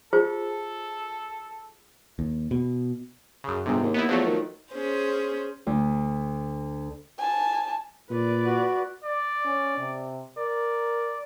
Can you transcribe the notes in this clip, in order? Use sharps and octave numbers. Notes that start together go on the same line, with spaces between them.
F4 G#4 A4 C5
D#2
B2
F#2 C#3
G1 G#2 C3
D#2
B3 D#4 E4
E2 F3 F#3 A3
D#3
C#4 G#4 C5
D2
G#5 A5
A#2 B4 D5
F#4
D5
C#4
C3
A#4 D5